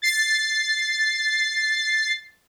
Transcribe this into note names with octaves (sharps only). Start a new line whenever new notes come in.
A6 C7